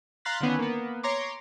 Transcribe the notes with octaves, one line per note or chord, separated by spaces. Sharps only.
F5 A#5 C6 F#6 A6 B6
D3 D#3 B3 C#4
A#3 B3
C#5 A#5 C6 D6